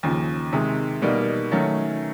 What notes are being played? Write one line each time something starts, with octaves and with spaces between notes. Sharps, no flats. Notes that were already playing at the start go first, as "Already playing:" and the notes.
D#2 C#3 F3
C3 D#3 G#3
B2 G3 A#3 D#4
D#3 F#3 A3 C#4